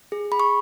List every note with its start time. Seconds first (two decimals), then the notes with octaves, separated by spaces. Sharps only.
0.12 G#4
0.31 G#4 B5
0.40 C#6